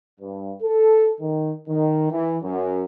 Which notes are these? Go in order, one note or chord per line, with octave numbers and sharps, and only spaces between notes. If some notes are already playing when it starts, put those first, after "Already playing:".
G2
A4
D#3
D#3
E3
F#2